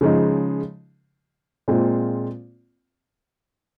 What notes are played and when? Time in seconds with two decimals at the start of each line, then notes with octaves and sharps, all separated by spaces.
0.01 C#3 F3 G#3 D#4
1.68 A#2 G#3 C4 F4